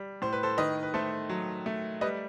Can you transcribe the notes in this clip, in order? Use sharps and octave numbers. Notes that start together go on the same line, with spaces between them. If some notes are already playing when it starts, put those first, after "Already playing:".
Already playing: G3
A2 C5
B4
A4 C5
D#3 B4 D#5
B4
A3 A4 C5
F#3
A3
G3 B4 D#5